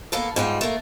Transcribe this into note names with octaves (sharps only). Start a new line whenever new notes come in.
A#3 B3 A4
G#2 G3 F4
A3 A#3